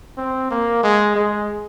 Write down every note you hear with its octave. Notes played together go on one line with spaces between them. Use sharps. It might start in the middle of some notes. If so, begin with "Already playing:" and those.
C4
A#3
G#3
G#3